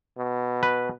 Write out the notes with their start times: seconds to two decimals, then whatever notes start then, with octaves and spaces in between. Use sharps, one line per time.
0.18 B2
0.63 B4